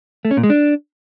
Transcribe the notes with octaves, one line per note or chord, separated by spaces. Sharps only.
A3
C#4
A#2
G#3
D4